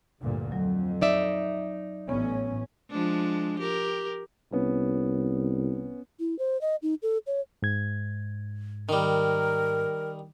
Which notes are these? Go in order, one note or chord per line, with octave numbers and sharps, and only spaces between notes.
D2 G2 A#2
F2 F#3
D#4 D5 E5
A1 A2 B3 C#4
F3 G#3 D4
G4 A#4
C2 B3 C#4
E4
C5
D#5
D#4
A4
C#5
G#2 G#6
D#3 G3 A#4